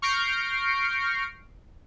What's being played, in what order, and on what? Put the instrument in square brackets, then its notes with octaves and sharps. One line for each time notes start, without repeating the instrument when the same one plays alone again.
[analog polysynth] C#6 F6 G6 A#6 C7 D7